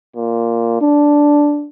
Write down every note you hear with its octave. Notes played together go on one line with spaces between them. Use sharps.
A#2
D4